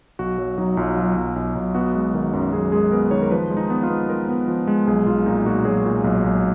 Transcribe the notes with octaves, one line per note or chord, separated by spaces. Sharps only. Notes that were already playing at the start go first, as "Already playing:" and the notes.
B1 F#4
F#3
F#3 D#4
B1 F4
F#3 F4
B1
B1
B1
B3 F#4
G#3
D#3
F#2
F#2 G#4
G#3 G#4
B3 A#4
D#3 C#5
A#4
F3 B4
G#3
D#4
B3
F4
B3
G#3 A#4
B3
F3
G#3
B1 G#4
B1 F4
A#2 D#4
A#2 F#4
F#3 G#4
A#2
B1
B1